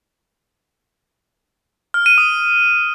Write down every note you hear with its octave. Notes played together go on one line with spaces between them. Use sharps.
F6
D#7
D#6